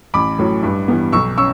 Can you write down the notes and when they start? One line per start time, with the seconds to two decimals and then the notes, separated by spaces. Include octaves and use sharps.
0.14 A1 B5 D6
0.39 A2 F#3
0.63 G2
0.88 E3 G3 B3
1.12 B1 C#6 E6
1.38 C#4 C#6 E6